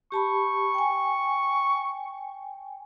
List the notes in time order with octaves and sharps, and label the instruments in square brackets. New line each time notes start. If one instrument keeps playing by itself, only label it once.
[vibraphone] G4 A5 B5 [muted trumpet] C#6
[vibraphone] G5 G#5